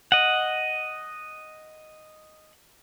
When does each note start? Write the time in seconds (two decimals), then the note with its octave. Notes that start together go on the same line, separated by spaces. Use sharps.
0.12 D#5 F#5